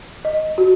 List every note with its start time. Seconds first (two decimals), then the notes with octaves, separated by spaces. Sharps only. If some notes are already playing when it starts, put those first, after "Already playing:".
0.25 D#5
0.58 F#4